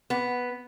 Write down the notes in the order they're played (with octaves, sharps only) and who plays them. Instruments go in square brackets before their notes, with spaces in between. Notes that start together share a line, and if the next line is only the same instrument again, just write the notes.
[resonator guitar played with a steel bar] B3